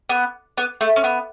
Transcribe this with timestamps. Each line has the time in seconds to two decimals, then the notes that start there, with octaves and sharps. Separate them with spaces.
0.09 B3
0.58 B3
0.81 A3
0.96 C#4
1.04 B3